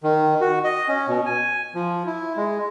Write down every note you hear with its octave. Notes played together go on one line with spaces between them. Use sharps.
D#3
F#4
D#5
C#4
B2
G#5
F3
E4
G#3